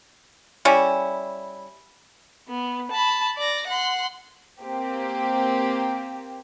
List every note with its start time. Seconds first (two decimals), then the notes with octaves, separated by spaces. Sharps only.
0.65 G3 C#4 E4
2.48 B3
2.91 A5 B5
3.37 D5 A#6
3.67 F#5 C6
4.61 A#3 C4 G4